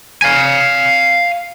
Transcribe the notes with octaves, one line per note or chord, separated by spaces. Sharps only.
F5 G#5